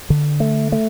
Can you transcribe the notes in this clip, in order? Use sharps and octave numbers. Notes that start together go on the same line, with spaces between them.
D3
A3
A3